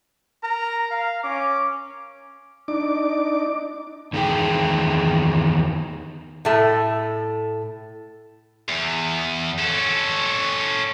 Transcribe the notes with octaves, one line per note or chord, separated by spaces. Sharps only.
A#4 A#5
F5
C#4 D6
D4 D#4 D6
E2 D#3 G3 D4 G#4 G5
A2 A3
E2
C#4 A4